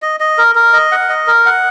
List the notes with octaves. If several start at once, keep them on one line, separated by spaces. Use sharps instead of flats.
D#5
D#5
A#4
A#4
D#5
F#5
D#5
A#4
F#5